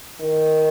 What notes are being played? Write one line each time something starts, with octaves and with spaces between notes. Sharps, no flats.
D#3